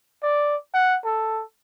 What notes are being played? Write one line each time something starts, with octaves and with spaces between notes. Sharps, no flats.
D5
F#5
A4